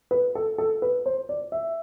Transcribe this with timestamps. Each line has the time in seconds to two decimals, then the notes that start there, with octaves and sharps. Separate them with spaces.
0.11 B4
0.35 A4
0.58 A4
0.82 B4
1.06 C5
1.29 D5
1.52 E5